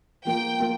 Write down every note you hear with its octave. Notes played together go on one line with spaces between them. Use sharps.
F3 A#3 F4 G5
A#3 F4